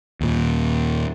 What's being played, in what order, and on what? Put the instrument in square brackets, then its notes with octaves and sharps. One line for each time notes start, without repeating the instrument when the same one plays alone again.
[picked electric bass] D#2 A#2